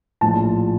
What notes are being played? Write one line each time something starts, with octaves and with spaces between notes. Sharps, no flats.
A#1 A2 F3 A5